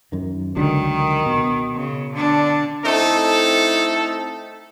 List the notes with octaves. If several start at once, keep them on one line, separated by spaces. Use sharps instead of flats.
F#2 D#3
C#2 D3 D#3 F#3
B2
C#3
D3 D4
A3 C4 D#4 E4 A4